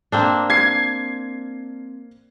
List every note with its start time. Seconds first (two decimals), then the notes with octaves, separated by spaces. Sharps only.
0.12 A#3 C4 D4
0.50 G#6 C7